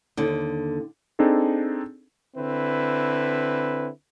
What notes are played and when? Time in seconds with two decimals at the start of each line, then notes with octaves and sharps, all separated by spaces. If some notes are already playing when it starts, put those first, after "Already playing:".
0.17 D#2 D3
1.19 C4 D4 D#4 G#4 A4
2.36 D3 C4 E4 B4